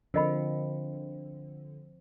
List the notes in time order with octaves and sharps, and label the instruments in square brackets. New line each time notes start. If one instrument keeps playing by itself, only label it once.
[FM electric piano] D3 [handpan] F3 C4 [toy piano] A#4 D#5 B5